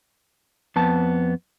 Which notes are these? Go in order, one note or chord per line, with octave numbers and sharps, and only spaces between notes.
F2 B3 A5